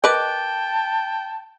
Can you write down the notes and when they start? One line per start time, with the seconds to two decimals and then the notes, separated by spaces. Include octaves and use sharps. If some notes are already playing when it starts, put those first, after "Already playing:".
0.04 A#4 B4 D#5 G5 A5 D6 F#6 D7